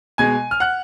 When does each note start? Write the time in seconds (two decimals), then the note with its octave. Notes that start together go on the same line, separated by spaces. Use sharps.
0.18 B2 G#3 G#5 G#6
0.51 F6
0.60 F#5 F#6